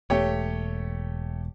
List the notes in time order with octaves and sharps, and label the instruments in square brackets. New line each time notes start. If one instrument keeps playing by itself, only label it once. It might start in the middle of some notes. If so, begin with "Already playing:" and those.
[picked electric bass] E1 [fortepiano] A3 G4 C#5